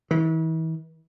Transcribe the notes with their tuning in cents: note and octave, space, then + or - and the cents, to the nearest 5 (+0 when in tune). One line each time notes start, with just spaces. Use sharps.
E3 -40